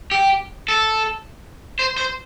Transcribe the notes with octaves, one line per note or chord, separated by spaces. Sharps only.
G4
A4
C5
C5